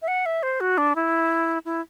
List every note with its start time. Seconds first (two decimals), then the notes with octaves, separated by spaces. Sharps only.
0.02 E5
0.08 F#5
0.26 E5
0.43 C5
0.60 F#4
0.78 D4
0.96 E4
1.65 E4